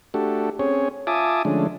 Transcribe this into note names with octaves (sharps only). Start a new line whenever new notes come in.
A3 D4 F#4 G4 A4
C4 C#4 G#4 C#5
F4 E5 G#5 A5 D6 D#6
D3 F3 G#3 A3 C#4 D4